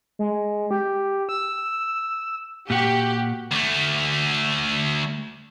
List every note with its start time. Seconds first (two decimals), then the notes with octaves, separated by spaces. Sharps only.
0.19 G#3
0.71 G4
1.29 E6
2.70 A#2 F#4 G4
3.51 D2 A3